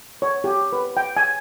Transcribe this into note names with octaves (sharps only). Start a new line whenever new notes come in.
C#5
G4
B4
G5
G#5